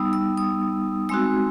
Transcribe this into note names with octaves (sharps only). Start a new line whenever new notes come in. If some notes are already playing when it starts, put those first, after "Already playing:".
Already playing: G3 B3 D#4 D#6 E6
E6
D#6
G#3 C4 D#4 F#4 E6